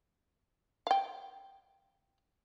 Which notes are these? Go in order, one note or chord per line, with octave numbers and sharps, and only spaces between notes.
F5 G5